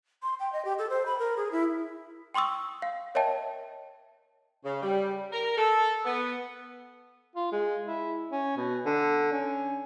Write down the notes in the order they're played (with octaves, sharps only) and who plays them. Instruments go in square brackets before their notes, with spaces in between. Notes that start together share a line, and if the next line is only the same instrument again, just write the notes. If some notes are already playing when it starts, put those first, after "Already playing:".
[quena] C6
G5
D#5
G4
A4
C5
B5
A#4
G#4
E4
[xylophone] G5 C6 C#6 D#6 E6
F5
A#4 C#5 D#5 E5 G5 A5
[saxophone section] C#3
G3
A#4
A4
B3
[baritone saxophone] F4
G#3
E4
C#4
B2
D3
C#4